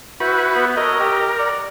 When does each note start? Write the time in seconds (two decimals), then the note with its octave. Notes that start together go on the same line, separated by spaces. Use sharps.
0.20 E4 F#4 B4 C5 E5
0.55 B3
0.77 F#4 A4 A#4 C#5 D#5
1.00 G4
1.39 D5 F#5